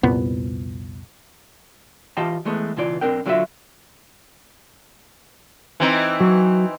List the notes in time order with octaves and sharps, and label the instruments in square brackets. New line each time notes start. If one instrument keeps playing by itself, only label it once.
[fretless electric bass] C2 F2 A#2 B3
[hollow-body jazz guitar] E3 F4 G4 D#5 G5 A5
E3 G#3 A3 B3
C#2 B2 E3 F4 D5
B1 C4 D4 A#4 G5
D3 F#3 C#4 F4 F#4 E5
[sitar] E3 C4 D#4
[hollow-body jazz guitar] F#3